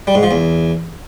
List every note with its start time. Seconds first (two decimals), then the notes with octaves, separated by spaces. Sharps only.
0.07 G3
0.15 G#2
0.23 F3
0.31 E2